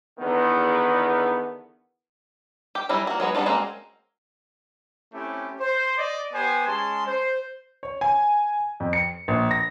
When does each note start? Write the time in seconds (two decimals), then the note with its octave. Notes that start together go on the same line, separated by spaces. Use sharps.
0.20 E2 D3 D#3 B3
2.75 G4
2.89 F#3 G3 C#4 E4
3.07 A#3 F#4
3.20 F#3 G#3 B3 C#5
3.35 G3 B3 C#4 D4 F4
3.46 G#3 A#3 C4 C#4 F#4
5.13 A3 C4 C#4 E4 G4
5.60 C5
5.98 D5 D#5
6.33 B3 G4 C5 G#5
6.67 G#3 C#4 A5 C6
7.06 C5
7.83 C#5
8.01 G#5
8.80 F2
8.93 C#7
9.28 A#1
9.51 A#6